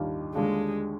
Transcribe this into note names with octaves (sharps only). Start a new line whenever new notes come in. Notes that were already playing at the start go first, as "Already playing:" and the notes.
Already playing: D#2 D#3 G3 D4 F4
D#2 D3 G3 G#3 D4 F4